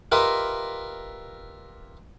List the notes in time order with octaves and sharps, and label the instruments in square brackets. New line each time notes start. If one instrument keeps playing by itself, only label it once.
[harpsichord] F4 G4 A#4 B4 D#5 E5